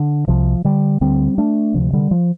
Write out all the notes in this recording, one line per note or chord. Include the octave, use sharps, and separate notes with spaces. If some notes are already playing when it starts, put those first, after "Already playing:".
Already playing: D3
C2 C3 F3
D3 G3
D2 D3 G3 C4
A3 D4
D2 C3 F3
D3 G3
F3